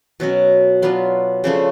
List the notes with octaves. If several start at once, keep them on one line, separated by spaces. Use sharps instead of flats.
B2 F#3 C#4 F#4
F#3 B3 D4 F4
C#3 F3 A3 D4